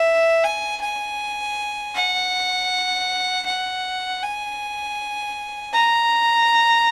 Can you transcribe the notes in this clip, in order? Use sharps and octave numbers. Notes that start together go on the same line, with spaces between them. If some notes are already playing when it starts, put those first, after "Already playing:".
Already playing: E5
G#5
G#5
F#5
F#5
G#5
A#5